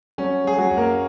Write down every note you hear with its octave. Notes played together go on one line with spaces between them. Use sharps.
F#3 C#4
F#3 G#4
F#3 F#4
F#2
A#3 A#4